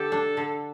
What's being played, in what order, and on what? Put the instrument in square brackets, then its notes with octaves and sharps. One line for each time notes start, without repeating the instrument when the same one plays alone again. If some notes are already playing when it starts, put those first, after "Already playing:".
Already playing: [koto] D3 G4 [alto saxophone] A4
[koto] D4
D3